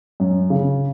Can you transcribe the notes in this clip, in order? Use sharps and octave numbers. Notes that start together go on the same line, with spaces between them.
F#2
C#3